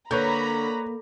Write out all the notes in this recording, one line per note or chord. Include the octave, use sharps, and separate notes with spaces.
D3 A#3 B4 C#5 A#5 B5 G6